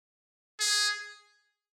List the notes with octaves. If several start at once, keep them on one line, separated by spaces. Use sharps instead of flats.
G#4